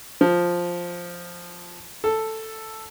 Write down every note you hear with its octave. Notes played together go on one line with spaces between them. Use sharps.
F3
A4